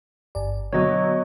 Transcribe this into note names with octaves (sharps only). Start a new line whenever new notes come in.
G1 D5
B2 D3 F#3 C#5 D#5